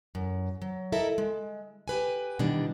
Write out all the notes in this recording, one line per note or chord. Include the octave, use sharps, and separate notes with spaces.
F#2
F#3
E4 A4 A#4 D#5 E5
G#3
G4 B4 G#5
B2 D#3 E3 G3 D4